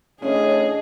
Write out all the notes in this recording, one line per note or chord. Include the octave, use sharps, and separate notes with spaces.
A2 C#4 D4 G#4 D#5